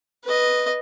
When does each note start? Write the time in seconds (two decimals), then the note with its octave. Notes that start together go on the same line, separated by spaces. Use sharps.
0.24 B4 D#5